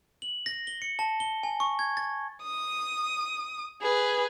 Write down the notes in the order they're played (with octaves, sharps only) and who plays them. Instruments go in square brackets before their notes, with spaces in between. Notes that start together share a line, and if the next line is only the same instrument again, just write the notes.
[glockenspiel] F#7
A#6
G7
C#7
A5
G7
G#5
C#6
G#6
A6
[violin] D#6
G#4 B4